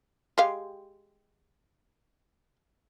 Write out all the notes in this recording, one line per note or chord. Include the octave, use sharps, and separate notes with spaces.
G#3 G4 F5